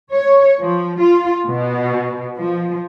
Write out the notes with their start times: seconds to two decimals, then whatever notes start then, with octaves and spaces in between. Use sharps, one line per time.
0.12 C#5
0.60 F3
1.01 F4
1.46 B2
2.38 F3